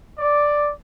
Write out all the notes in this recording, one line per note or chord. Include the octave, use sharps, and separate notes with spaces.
D5